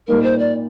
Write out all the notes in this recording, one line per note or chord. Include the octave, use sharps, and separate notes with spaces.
A#2 G3 A#3 D#4 A#4
C5
D5